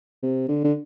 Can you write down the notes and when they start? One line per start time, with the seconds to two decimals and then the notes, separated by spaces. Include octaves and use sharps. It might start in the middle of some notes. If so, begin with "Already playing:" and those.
0.23 C3
0.48 D3
0.64 D3